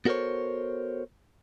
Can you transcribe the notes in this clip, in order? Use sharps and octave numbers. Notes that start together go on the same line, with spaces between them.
B3 F#4 A4 A#4 C5 C#5